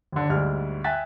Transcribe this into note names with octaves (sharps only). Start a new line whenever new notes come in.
D#2 D3
D2 G#2 G3 F6
E5 G5 G#5 F#6 A6 B6